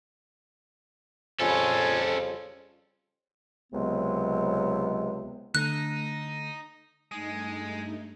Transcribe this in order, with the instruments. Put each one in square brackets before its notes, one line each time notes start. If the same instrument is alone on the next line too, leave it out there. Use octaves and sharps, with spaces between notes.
[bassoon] F2 [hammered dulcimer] C#3 G3 F4 [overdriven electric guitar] C#4 A4 [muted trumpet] G#5
[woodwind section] C#2 C3 F#3 G#3 B3
[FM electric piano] D3 A3 A#6 [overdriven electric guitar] D#4 [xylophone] F#6
[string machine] G2 A3 D#4 [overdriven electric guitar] G#3 [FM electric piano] D#6